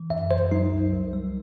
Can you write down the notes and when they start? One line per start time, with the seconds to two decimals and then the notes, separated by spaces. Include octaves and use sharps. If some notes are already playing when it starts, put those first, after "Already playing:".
Already playing: E3
0.10 F#2 E5
0.30 F#2 C5
0.51 F#3 D#4
0.72 C2
0.93 C2
1.13 G3